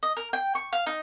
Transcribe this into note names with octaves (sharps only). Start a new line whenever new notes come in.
D#5
A#4
G5
C#6
F5
D#4